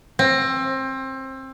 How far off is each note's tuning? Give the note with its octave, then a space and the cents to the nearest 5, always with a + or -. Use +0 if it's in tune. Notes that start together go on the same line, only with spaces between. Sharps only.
C4 +25